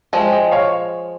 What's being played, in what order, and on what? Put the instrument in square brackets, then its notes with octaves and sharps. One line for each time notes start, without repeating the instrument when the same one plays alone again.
[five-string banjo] F3 G#3 [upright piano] D#5 G5
[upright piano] D#5 G5
C#5 F5